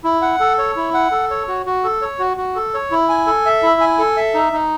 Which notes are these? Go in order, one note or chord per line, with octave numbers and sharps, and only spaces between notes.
E4
F#5
A4
C#5
E4
F#5
A4
C#5
F#4
F#4
A4
C#5
F#4
F#4
A4
C#5
E4
G#5
A4
E5
E4
G#5
A4
E5
D#4
D#4